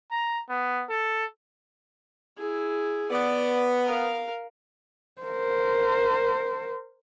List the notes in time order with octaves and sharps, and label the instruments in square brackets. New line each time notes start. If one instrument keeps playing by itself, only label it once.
[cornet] A#5
B3
A4
[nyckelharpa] E4 G#4
[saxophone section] B3 [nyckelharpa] D5
[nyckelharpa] A#4 F5
[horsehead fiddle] A#4 C5